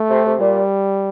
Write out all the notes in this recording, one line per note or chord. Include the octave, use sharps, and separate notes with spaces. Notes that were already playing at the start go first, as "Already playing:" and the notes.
Already playing: A3
C3
C3
A#2 G3